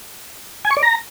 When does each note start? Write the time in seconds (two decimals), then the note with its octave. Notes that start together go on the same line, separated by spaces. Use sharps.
0.65 G#5
0.71 C#6
0.77 D5
0.83 A#5